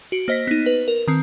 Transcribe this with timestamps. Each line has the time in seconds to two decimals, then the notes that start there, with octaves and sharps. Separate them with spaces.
0.12 F#4 D7
0.28 A#3 C5 D#5 A#6 B6
0.47 B3 D#4
0.66 B4
0.88 A#4
1.08 D#3 C4